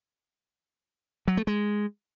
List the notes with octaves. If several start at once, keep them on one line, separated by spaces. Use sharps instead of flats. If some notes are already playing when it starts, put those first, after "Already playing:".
F#3
A3
G#3